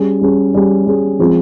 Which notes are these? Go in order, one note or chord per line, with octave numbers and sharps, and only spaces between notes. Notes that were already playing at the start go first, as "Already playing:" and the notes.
Already playing: G3 C#4 G#4
G3 C#4 G#4
G3 C#4 G#4
G3 C#4 G#4
F3 G#3 C4 F4 G#4